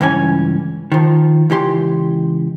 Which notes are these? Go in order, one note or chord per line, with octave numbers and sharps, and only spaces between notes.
C#2 G2 E3 C#4 G#5
D#3 F3
C#2 E3 G4 C6